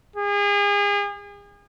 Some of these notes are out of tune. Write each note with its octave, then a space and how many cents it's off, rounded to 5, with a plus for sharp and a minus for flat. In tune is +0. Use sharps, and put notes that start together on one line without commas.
G#4 -35